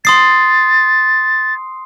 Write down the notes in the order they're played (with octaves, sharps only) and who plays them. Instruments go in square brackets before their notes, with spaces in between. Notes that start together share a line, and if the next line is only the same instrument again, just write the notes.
[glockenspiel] C6 D#6 C7 [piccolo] A6